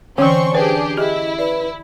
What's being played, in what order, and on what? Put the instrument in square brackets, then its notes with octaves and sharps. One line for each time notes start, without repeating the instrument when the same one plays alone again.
[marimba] D3 E3 [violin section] C4 C6 C#6 [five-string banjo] C#4 [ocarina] C5
[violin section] D4 G4 G#4 [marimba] B4
[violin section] E4 [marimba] G4 G#4 [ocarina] D#5
[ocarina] B4 [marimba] D5